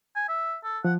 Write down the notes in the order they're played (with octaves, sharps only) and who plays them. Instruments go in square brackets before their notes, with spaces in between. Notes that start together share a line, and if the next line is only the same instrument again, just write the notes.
[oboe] G#5
E5
A4
[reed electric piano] F3 [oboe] F#5